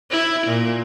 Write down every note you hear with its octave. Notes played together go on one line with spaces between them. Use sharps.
E4
A#2